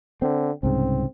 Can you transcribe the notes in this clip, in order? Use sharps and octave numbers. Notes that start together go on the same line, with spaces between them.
D3 C4
C2 G#2 C#3 C4